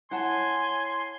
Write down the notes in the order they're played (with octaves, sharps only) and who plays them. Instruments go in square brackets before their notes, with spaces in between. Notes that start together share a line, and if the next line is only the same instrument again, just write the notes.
[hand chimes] E4 [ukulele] C#5 F#5 A5 [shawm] G#5 [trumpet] C6